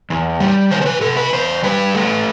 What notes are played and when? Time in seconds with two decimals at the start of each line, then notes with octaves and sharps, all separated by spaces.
0.10 E2
0.40 G3
0.71 D#3 C5
0.82 C5
0.86 B4
1.01 C3 A4
1.17 B4
1.32 E2 C5
1.63 G3 B4
1.94 A3